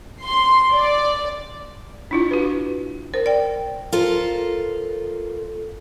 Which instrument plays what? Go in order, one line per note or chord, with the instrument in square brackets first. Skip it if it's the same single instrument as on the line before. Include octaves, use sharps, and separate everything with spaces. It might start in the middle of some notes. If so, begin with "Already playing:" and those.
[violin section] C6
D5
[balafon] D4 E4 F4
F#4 B4
[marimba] A#4 [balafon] C5
[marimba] D5 G5
[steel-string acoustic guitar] F4 A4 A#4 C5